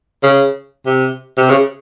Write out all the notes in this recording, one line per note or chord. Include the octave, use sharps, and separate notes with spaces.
C#3
C3
C3
C#3